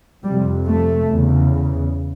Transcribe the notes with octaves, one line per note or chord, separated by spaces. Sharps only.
F2 C3 G3
A3
E2 C#3